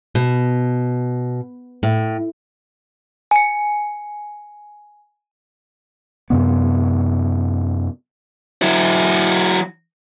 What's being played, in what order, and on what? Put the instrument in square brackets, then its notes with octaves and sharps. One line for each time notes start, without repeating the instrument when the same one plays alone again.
[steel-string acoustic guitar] B2
A2
[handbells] G#5 C#7
[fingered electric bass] F#2 C3 B3
[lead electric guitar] F#3 E4